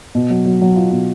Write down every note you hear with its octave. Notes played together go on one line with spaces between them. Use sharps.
B2
F#3
F#3
F#3
F4
B2